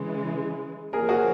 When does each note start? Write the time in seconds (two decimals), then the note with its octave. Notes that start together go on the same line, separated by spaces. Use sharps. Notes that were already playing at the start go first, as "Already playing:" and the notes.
Already playing: C#3 E3 G#3
0.93 F3 A#3 C#4 G#4 A#4
1.09 F#4 G#4